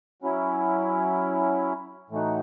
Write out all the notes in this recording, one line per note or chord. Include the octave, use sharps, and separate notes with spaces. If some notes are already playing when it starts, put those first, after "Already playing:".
F#3 C#4 E4
A2 E3 A3 D#4 F#4